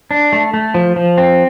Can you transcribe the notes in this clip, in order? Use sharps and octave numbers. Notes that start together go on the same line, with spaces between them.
D4
A3
A3
F3
F3
C4